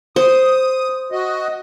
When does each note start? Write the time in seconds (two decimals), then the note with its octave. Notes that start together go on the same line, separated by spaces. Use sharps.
0.16 C5 D#6
1.12 F#4 D#5